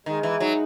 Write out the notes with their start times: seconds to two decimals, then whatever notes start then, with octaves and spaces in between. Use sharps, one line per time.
0.06 D#3 G#3
0.23 E3
0.40 F#3 D#4